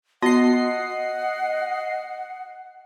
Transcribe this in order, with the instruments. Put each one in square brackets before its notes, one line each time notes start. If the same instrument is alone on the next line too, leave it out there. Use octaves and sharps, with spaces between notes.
[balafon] B3 [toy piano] F#4 [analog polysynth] D#5 C7 [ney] F#5